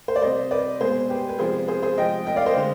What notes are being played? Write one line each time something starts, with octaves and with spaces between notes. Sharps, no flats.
C5
D5
C3 G3 C5 D#5
B4 D5
B2 G#3 G#4 C5
G4 B4
B4
C3 F3 G#3 G#4 C5
G#4 C5
G#4 C5
C3 F3 G#3 D#5 G5
D#5 G5
D5 F5
C5 D#5
D3 G#3